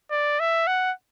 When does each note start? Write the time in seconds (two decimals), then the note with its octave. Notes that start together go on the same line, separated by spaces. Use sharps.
0.11 D5
0.40 E5
0.67 F#5